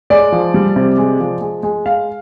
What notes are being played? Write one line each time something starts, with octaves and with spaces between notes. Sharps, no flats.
G#3 D5
F3
G3
C3
G#3
F3
G#3
G#3
G#3 F5